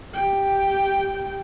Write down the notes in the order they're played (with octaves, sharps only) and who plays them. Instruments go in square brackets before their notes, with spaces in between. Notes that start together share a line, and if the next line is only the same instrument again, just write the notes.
[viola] G4 G5